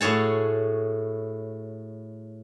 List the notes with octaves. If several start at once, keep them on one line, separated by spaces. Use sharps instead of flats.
A2 F#4 G#4 C#5 A5